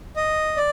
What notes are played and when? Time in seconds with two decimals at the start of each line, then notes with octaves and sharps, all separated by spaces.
0.16 D#5
0.57 D5